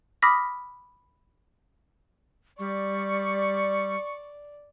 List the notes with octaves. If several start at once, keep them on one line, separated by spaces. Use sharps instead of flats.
B5 D6 D#6 F6 A#6 B6
G3 D5 C#6